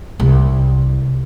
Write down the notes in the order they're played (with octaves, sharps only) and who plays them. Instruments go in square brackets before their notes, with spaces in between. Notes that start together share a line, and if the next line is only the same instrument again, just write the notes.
[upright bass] C2